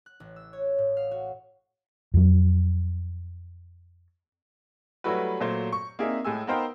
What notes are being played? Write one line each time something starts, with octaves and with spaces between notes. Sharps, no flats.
F#6
A1
E6
C#5
A2
F5
F#4
F2 F#3
F#3 G3 A3 E4 F#4 B4
A#2 F#3 A3 C5
C#6
A#3 C4 D4 D#4 G#4 E5
A2 G#3 G#5 E6
B3 D#4 A#4 C5 F5 G5